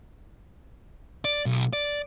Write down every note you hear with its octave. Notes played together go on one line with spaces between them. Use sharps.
D5
B1
D5